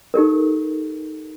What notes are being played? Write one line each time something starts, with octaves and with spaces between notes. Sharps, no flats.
D#4 G4 A4 A#4